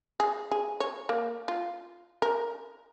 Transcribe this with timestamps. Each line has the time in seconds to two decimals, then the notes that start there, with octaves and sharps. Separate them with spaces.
0.20 G#4
0.51 G#4
0.80 C#5
1.09 A#3
1.48 F4
2.22 A#4